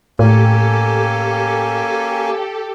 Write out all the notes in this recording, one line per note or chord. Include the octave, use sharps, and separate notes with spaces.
A2 A#3 C#4 G4 A4 G#5